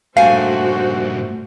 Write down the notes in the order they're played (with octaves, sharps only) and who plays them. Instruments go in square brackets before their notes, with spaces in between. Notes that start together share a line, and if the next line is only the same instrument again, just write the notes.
[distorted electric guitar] G2 A#2 [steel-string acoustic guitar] A3 G#5 [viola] F#4 C5 [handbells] F5